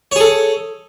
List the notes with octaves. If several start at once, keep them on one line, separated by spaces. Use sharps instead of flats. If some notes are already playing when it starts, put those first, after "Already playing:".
G#4 A4 C#5